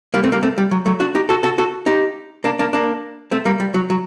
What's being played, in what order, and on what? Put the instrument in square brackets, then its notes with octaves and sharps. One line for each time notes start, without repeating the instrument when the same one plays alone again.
[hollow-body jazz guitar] G3 A#3
A3 C4
G3 A#3
A3 C4
G3
F#3
F#3 A3
D4 F#4
D#4 G4
F#4 A4
F#4 A4
F#4 A4
D#4 G4
A#3 D4
A#3 D4
A#3 D4
A3 C4
G3 A#3
G3
F#3
F#3